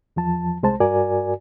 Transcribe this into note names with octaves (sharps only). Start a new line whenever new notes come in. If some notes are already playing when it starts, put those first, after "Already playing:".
E2 F3 A5
C2 G#3 C5 A5
G2 F#4 A#4 D5 G#5